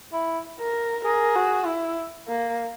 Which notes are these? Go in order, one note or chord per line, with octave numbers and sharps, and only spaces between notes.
E4
A#4
G#4 A#4
F#4
E4
A#3